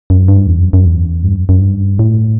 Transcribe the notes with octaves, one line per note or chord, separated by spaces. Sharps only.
F#2
G2
E2
F#2
F#2
E2
G2
F#2
F#2
G2
A2